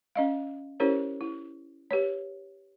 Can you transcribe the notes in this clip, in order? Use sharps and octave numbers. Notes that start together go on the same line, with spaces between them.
C#4 D#5 F5
C#4 E4 G4 A#4 C5 C#5
E4
G4 B4 C#5